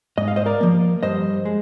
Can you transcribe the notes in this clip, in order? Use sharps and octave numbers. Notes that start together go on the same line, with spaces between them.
G#2 D#5
F5
C5 D#5
A#4 D5
F3 A#3
G2 C5 D#5
G#3